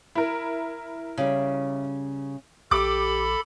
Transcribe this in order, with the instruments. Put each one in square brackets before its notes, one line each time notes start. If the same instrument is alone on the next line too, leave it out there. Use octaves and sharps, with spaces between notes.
[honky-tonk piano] E4 A#4
[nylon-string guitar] C#3 G3
[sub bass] A#1 [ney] G4 [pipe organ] A4 B5 [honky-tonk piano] D6